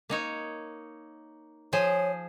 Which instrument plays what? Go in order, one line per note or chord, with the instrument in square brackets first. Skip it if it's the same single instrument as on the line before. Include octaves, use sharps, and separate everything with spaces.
[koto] A#3 D#4 C#5
[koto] F3 G#4 C5 [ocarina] C#5